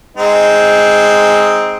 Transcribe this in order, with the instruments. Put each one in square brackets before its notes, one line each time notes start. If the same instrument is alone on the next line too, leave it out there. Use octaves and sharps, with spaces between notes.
[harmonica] G#3 C4 D#4